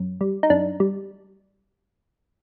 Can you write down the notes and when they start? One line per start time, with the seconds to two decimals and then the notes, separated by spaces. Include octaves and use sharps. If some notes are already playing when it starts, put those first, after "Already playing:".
Already playing: F#2
0.21 G3
0.43 D#4
0.50 F#2 D4
0.80 G3